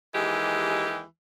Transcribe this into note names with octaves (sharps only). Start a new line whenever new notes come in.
D#2 E3 G#3 G4